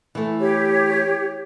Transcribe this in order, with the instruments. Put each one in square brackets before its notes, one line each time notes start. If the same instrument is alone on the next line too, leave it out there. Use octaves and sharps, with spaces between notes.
[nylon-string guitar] E3 A3
[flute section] G4 C#5